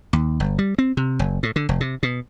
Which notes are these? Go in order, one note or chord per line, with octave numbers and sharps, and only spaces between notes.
D#2
G1
G3
C4
C3
F#1
A2
D3
F1
C3
B2